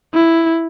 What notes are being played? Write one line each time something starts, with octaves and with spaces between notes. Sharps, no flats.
E4